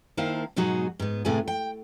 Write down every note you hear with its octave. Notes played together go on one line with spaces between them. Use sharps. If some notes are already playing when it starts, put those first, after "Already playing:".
D#3 A#3 E4 C5 F5 A5
G#2 B2 F#3 D#4 F#4 G#4
G#2 B3
A2 C3 A3 B3 G#4 G#5
G5